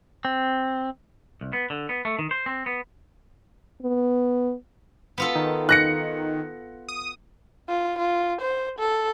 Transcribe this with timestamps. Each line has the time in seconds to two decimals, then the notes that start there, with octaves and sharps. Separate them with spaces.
0.25 C4
1.41 C2
1.53 B3
1.70 D3
1.89 B3
2.05 A3
2.19 D#3
2.31 C5
2.46 C4
2.66 B3
3.82 B3
5.18 B3 F4 A4
5.35 D#3
5.69 F#6 A#6 C#7
6.88 D#6
7.69 F4
7.99 F4
8.41 C5
8.79 A4